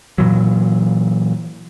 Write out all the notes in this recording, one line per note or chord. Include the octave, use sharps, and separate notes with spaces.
A#2 E3 F#3